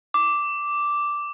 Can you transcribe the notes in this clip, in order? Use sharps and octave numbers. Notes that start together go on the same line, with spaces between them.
D6